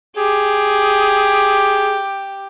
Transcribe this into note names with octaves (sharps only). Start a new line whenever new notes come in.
G4 G#4